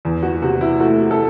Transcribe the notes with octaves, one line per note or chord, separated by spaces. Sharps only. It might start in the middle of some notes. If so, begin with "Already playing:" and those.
E2
F#4
C3 F#4
E4
A3 F#4
A4